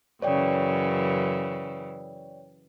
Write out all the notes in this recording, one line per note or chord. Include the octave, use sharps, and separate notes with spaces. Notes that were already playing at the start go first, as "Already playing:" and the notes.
F#2 C#3 E3 C#5 D5 G5